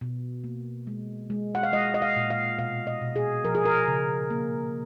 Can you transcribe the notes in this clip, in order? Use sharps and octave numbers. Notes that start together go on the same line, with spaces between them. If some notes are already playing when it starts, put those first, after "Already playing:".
B2
A#3
G#3
G#3
F#5
F5
G#3 D#5
D#5
F5
A#2
F5
B2 F5
D#5
B2
G#4
F3 A#4
G#4
A#4
C#3
A#3